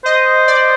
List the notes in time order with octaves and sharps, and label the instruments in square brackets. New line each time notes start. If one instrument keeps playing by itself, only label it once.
[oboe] C5 [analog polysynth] D#5
[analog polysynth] D5